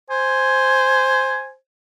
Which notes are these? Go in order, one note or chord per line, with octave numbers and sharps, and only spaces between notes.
C5 G#5